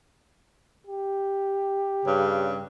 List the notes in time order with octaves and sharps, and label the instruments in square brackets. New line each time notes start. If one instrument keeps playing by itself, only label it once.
[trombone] G4
[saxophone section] G2 C#3